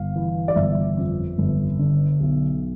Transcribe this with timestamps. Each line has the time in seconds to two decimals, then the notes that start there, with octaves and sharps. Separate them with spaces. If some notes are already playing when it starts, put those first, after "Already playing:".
Already playing: G1 F5
0.16 E3
0.48 D5
0.56 G1 E5
0.98 F2
1.38 G1
1.79 D3
2.20 B1